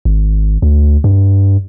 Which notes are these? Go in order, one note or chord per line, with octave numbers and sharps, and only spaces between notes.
G#1
D2
G2